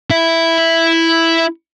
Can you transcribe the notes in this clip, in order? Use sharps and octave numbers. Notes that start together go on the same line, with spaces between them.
E4 E5